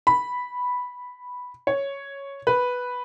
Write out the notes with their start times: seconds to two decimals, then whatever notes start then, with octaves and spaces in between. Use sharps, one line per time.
0.07 B5
1.67 C#5
2.47 B4